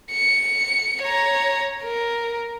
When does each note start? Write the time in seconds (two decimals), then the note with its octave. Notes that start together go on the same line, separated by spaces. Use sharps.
0.11 C#7
1.02 C#5 A#5
1.83 A#4